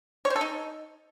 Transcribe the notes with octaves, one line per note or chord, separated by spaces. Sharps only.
C#5
C5
A4
D#4